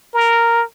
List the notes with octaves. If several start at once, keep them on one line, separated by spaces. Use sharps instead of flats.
A#4